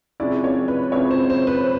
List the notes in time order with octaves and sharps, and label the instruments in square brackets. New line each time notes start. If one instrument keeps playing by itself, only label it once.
[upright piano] C3 F3 G#3 C#4 E4 [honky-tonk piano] D5
[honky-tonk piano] C#5
B4
[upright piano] C3 F3 G#3 C#4 E4 [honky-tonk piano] C#5
[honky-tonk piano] C5
C5
B4